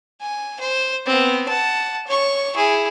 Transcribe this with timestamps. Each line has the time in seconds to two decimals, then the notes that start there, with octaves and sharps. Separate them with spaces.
0.21 G#5
0.60 C5
1.06 B3 C4
1.48 F#5 A5
2.07 C#5 C#6
2.56 E4 G#4